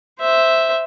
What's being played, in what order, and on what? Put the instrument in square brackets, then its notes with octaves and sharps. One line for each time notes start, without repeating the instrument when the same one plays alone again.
[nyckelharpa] C5 E5